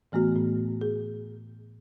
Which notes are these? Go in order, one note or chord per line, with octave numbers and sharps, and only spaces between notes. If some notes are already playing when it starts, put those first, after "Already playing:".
A2 E3 A3 B3 F#4
A2
G#4